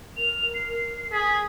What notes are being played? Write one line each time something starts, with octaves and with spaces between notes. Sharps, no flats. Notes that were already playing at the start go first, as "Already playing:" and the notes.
A#4 F7
C7
G#4 B6